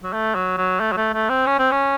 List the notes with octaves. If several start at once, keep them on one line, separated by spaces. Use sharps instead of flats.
F#3
A3
F#3
F#3
A3
F#3
A3
A3
C4
C#4
C4
C#4